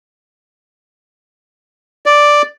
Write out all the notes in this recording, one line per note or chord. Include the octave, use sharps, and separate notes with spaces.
D5